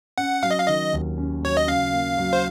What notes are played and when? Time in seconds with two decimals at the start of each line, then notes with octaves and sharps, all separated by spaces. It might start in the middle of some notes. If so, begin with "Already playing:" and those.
0.18 C#4 F#5
0.43 F#3 F5
0.51 D#5
0.59 F5
0.68 D#3 D#5
0.93 D#2
1.17 C#4
1.43 F#3 C#5
1.57 D#5
1.67 C#3 F5
1.93 A#3
2.18 F#3
2.33 C5